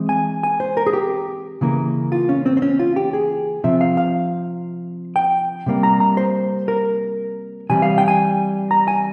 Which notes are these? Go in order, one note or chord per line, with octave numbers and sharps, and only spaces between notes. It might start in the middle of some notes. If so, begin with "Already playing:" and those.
Already playing: E3 G#3 C4
G#5
G#5
C5
A#4
G#4
G4
C#3 E3 A#3
F4
C#4
C4
C4
C#4
F4
G4
G#4
C3 F3 C4 E5
F5
F5
G5
C3 G3 A#3
A#5
A#5
C5
A#4
C3 E3 G3 G#5
F5
G5
G#5
A#5
G#5